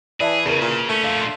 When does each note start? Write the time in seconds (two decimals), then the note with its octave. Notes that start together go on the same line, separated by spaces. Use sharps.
0.20 E3 G#4 D5 E5 A5
0.45 E2 C#3 A#4 B4
0.61 A#2
0.89 A3 C#4
1.04 A#2 D3 D#5 F5
1.21 C6 C7